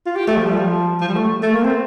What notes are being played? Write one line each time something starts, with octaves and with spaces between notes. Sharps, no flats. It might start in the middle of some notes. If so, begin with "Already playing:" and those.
F4
G4
A3
F3
G3
F3
F3
G3
A3
A3
A#3
C4